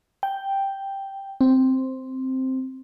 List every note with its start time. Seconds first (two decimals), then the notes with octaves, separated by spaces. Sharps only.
0.23 G5
1.41 C4